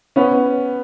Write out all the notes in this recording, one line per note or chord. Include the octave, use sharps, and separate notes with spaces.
B3 C#4